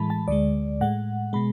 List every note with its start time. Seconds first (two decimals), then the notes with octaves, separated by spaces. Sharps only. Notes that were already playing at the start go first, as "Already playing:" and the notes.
Already playing: A2 E3 G#3 A5 B5
0.10 A5
0.28 D2 D3 G#3 D5
0.81 A2 G#3 F#5
1.33 B2 G#3 B5